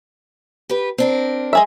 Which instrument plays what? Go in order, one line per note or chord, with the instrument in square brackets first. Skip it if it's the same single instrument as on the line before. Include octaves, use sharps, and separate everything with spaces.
[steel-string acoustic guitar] G4 B4
C4 D4 A#4
[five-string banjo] G#3 G#4 E5